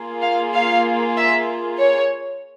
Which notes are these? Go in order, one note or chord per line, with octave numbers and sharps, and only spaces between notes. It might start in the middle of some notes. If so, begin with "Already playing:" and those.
Already playing: A#3 F4 G#4
F5
F5
E5
C#5